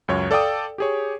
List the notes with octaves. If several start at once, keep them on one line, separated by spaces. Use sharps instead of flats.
C#2 F#2 C#5
A4 D5 F5 G5 D#6
G4 G#4 C#5